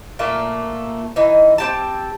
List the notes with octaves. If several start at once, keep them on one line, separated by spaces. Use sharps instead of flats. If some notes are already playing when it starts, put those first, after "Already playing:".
A#2 A3 A#3
E3 D#4
C4 G4 A5